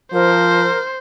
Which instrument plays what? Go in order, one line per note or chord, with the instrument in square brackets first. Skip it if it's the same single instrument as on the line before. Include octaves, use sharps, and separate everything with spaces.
[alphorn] F3 [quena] A#4 [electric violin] C5